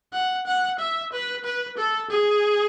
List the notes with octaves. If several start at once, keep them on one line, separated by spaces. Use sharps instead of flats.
F#5
F#5
E5
B4
B4
A4
G#4